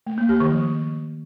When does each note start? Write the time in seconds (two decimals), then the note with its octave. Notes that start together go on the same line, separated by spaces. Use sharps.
0.07 A3
0.18 A#3
0.29 G4
0.40 D#3
0.52 F3